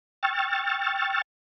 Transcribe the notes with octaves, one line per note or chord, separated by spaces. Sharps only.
G5 C#6 E6 F6 A6